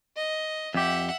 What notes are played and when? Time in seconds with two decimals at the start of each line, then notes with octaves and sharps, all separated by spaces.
0.16 D#5
0.74 F2 G4 E5 F#5